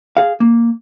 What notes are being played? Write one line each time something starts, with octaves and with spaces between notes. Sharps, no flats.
G#4 F5
A#3